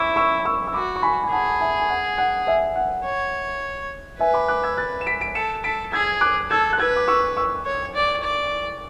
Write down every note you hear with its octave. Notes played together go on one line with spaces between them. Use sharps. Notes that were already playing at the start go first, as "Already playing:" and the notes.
Already playing: E4 B5 C#6 D6 E6
C#6 E6
C#6 E6
E6
F#4 B5 D6
C#6
G#5 B5
G#5
G#4 F#5 A5
E5 G#5
G#5
F#5
F#5
E5 G#5
F#5
C#5
B4 E5 G#5
B5 D6
D6 F#6
E6 G#6
F#6 A6
E7
B6 D7
B6 D7
A4 C#7 E7
A4 B6 D7
G#4 E6 G#6
D6 F#6
A4 E6 G#6
F#6
B4 E6 G#6
D6
C#6 E6
C#6 E6
C#5
D5
D5